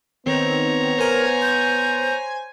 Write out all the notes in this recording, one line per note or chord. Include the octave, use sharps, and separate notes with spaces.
D#3 B3 C4 C#5 A#5
A#4 C5 G#5
G6